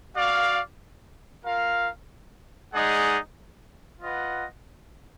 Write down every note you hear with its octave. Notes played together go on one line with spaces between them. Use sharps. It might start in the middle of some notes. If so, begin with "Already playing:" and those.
F#4 D5 F5
F4 A#4 F5
G#3 D#4 G#4 D5 F#5
F4 B4 D#5 F#5